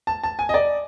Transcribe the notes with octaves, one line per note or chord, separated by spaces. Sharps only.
A5
A5
G#5
D#5
D5